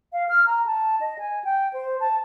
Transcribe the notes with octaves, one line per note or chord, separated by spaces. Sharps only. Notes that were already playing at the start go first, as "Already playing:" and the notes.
F5
F6
A#5
A5
D#5
G#5
G5
C5
A5